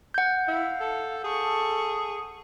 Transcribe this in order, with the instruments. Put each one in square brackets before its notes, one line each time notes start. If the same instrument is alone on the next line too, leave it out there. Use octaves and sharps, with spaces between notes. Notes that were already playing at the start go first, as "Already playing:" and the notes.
[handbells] F#5 G6
[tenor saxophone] E4 [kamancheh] F5
[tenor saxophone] A4
[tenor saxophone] G#4 [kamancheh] A4 C#6